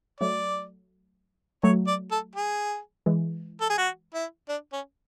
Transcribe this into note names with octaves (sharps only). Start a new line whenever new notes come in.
F#3 A3 D5
F#3 A3 C#5
D5
A4
G#4
E3 G#3
A4
G#4
F#4
E4
D4
C#4